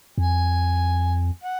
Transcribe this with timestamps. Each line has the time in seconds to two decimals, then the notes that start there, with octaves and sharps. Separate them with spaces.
0.17 F2 G#5
1.43 F#5